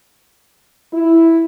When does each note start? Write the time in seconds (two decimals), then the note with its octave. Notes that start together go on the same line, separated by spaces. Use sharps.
0.94 E4